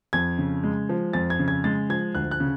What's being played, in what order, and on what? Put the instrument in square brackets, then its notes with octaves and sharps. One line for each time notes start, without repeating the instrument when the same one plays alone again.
[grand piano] F2 G#6
C#3
G#3
F3
F2 A6
G#6
C#3
G#6
G#3 A6
F3 G#6
D2 F#6
F#6
C#3